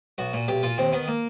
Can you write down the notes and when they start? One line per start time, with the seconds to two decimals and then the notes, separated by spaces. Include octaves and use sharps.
0.18 B1 F#4
0.33 A#2
0.48 B1 G4
0.63 A#2 F4
0.78 D#2 C4
0.93 D#3 B3
1.08 A#3